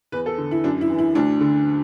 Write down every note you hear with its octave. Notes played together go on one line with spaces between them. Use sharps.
E2 B4
A4
D3
E4
F#2 D4
E4
E3
E4
D2 D4
D3